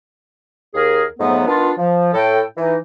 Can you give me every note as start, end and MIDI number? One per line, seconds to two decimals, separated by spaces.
0.75 1.04 39
0.75 1.04 68
0.75 1.04 70
1.19 1.42 41
1.19 1.42 44
1.19 1.42 54
1.19 1.42 57
1.19 1.42 59
1.46 1.72 51
1.46 1.72 59
1.46 1.72 62
1.46 1.72 65
1.78 2.11 53
2.13 2.41 45
2.13 2.41 69
2.13 2.41 79
2.57 2.76 52
2.57 2.76 63